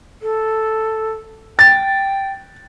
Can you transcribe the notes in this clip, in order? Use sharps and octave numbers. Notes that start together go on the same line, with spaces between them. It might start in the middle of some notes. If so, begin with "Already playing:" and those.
A4
G5 A6